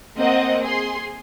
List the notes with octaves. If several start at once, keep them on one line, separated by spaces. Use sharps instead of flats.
A#3 C4 D#5 F#5
G#4 C6